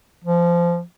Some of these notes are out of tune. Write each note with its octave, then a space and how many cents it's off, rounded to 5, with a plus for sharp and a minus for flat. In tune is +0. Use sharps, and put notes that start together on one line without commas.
F3 -20